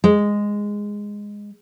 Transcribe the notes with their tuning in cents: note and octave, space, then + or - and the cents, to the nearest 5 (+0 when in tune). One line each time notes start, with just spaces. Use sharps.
G#3 -10